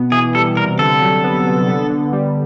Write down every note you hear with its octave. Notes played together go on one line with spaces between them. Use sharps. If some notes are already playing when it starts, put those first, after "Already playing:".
Already playing: B2 B3
E3 G#4
G3 A4
C3 A#4
D3 A4
F#3
B3
D3
B3
D3
G3